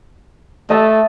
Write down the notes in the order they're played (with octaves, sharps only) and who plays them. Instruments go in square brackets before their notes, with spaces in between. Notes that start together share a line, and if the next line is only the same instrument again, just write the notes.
[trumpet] A3 [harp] D#5 E5 A5